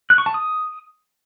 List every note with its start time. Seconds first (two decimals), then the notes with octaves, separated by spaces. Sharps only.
0.10 F#6
0.18 C#6
0.26 A5
0.34 D#6